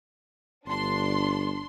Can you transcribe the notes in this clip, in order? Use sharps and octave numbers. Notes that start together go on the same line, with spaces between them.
G1 D4 C6